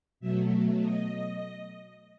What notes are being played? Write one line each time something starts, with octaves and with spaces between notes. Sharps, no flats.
B2 F#3 A3 E5
D#5